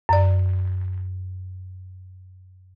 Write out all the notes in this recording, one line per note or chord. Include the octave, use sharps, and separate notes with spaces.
F#2 D5